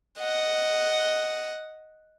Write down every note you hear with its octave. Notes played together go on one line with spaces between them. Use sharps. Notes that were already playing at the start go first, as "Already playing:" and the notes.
D#5 F#5